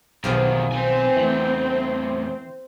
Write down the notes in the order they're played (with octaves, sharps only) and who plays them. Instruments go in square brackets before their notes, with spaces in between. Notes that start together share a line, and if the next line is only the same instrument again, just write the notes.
[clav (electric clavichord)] B1 G4 G#4 [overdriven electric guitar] E2 D#3 [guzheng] F3 A#3 B3
[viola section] C4 [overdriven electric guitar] B4 G#5
[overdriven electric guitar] E2 A3 [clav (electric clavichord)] E3